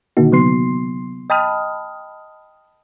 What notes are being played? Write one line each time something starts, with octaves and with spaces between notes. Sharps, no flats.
A#2 D3 D#3 A#3 D#4 F#4
C3 F#3 B3 C6 C7
D#5 G5 A5 B5 D#6 F6